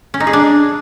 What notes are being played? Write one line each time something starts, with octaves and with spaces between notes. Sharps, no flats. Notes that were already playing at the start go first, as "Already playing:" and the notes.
C#4
D#4
G#4
D4